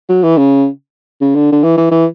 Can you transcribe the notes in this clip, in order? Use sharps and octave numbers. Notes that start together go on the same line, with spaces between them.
F#3
E3
C#3
C#3
D3
D3
E3
E3
E3